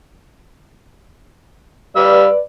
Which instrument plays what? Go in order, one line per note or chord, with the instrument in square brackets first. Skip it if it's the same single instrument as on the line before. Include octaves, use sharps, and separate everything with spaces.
[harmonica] G3 F5 E6 [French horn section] B4 D5